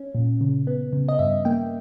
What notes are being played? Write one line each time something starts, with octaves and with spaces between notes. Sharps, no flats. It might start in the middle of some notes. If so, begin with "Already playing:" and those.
Already playing: C#4
A#2
C#3
B3
C#3
D#5
G2 E5
A#3 G5